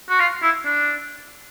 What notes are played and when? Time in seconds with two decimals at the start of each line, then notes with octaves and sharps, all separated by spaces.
0.09 F#4
0.20 F4
0.42 E4
0.65 D4